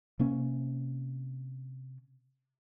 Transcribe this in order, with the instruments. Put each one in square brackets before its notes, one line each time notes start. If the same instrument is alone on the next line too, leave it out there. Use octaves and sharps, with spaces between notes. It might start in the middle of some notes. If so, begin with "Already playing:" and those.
[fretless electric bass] C3 A#3 C#4